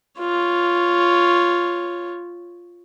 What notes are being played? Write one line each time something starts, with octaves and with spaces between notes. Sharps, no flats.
F4 C#5